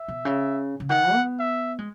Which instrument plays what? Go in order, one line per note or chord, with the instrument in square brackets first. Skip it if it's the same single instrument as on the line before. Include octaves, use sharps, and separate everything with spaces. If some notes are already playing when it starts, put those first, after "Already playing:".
Already playing: [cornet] E5
[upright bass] B2
C#3
C#3
[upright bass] D#3 [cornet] F#5
[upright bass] B3
[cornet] E5
[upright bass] G#3